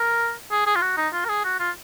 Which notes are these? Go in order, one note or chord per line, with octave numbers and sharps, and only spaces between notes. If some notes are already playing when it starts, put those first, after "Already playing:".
Already playing: A#4
G#4
G#4
F4
F#4
D#4
F4
A#4
G#4
F#4
F4